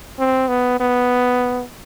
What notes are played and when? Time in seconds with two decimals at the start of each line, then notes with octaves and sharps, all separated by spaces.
0.19 C4
0.48 B3
0.80 B3